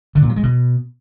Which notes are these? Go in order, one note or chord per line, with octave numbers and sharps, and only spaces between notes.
D3
A#2
F#3
G#3
B2